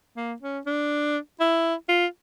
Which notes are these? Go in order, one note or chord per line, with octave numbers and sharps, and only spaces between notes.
A#3
C#4
D4
E4
F4